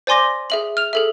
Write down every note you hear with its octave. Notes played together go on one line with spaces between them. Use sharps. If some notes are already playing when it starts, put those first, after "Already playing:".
C5 D5 G#5 C6 D6 A#6
G#4 E5 F#7
F6 F7
G#4 A4 E5